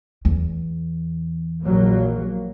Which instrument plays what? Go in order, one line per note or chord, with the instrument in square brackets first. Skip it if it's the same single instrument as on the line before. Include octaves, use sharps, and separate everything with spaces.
[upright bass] E2
[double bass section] A#1 F#3 A#3